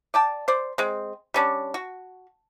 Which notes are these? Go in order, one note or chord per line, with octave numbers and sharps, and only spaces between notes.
D5 G5 A5
C5 D5
G#3 C4
G3 C#4 D4
F#4